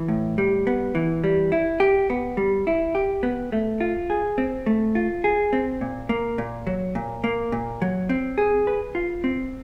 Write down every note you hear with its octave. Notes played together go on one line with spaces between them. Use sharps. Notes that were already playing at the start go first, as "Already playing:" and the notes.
Already playing: E3
A2
G3
B3
E3
G3
E4
G4
B3
G3
E4
G4
B3
A3
F4
G#4
C4
A3
F4
G#4
C4
A#2
A#3
A#2
F#3
A#2
A#3
A#2
F#3
C4
G#4
B4
F4
C4